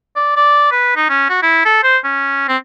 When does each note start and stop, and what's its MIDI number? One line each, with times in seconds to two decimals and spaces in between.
0.16 0.35 74
0.36 0.67 74
0.72 0.96 71
0.96 1.08 63
1.10 1.25 61
1.29 1.39 66
1.43 1.65 64
1.65 1.81 69
1.84 1.98 72
2.04 2.44 61
2.48 2.57 60